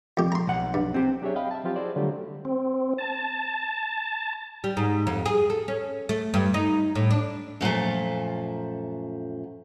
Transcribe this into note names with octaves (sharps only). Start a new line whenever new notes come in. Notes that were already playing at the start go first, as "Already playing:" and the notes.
F2 G4
A#5 C6
B1 F#5
G2
C4 G4
F#3 D4 G4 G#4 C#5 E5
D#5 F5 G5 B5
E5 A5
F3 F#3 C4 F4 G4
E4 F#4 G#4 C5 D5
D3 F#3 G3 A3 F4 G4
C4
A5
G3
G#2
F2
G#4
A4
C#4
A3
G2
D#4
A2
D4
F#2 A#2 F3 A3